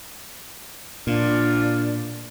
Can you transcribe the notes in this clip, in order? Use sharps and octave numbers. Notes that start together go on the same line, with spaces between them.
A#2 D4 F4